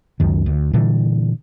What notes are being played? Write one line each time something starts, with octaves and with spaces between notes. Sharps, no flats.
C#2 F#2 D#3
D2
A#2 D3 E3 G3